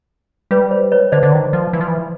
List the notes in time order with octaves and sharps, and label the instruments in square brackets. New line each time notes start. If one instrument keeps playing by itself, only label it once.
[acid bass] G3 [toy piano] B4
[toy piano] C5
B4 C#5
[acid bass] D3 [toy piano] C5 D5
[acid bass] D3
D#3
F3
E3
F3
E3